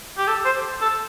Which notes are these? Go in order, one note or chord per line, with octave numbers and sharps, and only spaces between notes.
G4
A4
C5
A4